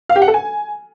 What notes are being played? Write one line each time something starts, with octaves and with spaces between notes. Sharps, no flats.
F5
G4
F#5
A4
G#5